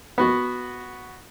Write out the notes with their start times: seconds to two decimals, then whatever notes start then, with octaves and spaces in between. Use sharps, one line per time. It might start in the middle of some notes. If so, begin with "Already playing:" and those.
0.18 B3 F#4